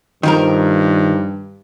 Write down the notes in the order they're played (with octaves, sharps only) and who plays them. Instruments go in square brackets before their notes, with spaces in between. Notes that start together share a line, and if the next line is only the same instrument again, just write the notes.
[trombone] G2 [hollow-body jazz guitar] D#3 F3 A#4